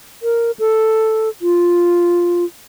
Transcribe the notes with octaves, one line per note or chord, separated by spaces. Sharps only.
A#4
A4
F4